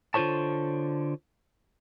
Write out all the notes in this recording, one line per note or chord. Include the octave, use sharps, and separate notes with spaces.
D3 F4 F#4 C5 C#5 A5